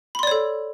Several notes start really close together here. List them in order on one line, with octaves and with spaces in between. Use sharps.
B5 C6 D5 C#5 A4